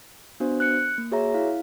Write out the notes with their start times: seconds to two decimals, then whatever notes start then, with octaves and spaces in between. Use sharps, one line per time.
0.40 B3 D4 F#4 C5
0.60 F#6 C#7
0.98 A#3
1.11 F#4 G#4 C#5 E5 A#5
1.34 E4 F5